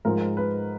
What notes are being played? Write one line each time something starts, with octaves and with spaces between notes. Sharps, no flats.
G#2 F3 G#3 A#4
B4